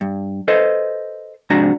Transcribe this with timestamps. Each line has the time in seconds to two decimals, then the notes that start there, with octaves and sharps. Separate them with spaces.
0.01 G2
0.48 A4 B4 C5 D#5
1.50 F2 G#2 C3 D4 F#4 A#5